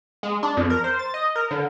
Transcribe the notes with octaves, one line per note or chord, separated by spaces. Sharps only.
G#3
D4
F2
A#4
C5
A6
D#5
A#4
D3